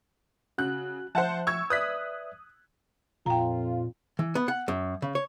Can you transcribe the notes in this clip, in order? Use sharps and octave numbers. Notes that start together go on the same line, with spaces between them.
C#3 F#4 F#6
F3 C5 E5 F#5 A5 F#6
C#6 E6 G#6
B4 D5 E5 D#6 F#6 B6
F2 A#2 F4 G5 A#5
E3
B3
F#5
F#2
C#3
C#5